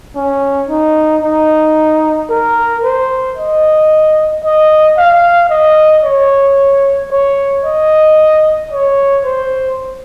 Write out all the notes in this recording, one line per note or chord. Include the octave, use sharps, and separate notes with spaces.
C#4
D#4
D#4
A#4
C5
D#5
D#5
F5
D#5
C#5
C#5
D#5
C#5
C5